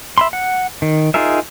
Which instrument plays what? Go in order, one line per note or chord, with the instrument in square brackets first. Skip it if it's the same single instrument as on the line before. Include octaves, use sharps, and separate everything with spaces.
[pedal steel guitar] E5 B5 C6
F#5
D#3
D#4 F4 G#4 A#4 E5